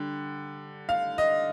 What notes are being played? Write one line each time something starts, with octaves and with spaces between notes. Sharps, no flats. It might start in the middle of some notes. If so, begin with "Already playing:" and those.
Already playing: D3 G3
F5
D#5